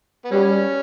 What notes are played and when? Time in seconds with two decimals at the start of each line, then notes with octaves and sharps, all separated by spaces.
0.25 B3
0.31 F#3 G3 C#4